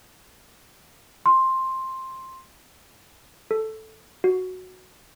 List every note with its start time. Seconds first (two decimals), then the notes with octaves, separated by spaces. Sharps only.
1.26 C6
3.51 A4
4.24 F#4